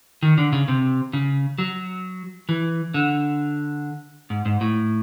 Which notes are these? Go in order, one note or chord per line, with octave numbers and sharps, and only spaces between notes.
D#3
D3
C#3
C3
C#3
F#3
E3
D3
G#2
G#2
A2